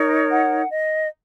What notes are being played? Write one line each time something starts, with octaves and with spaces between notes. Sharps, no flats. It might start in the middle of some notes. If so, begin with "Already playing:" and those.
Already playing: D#4 A#4 C#5
F#5
D#5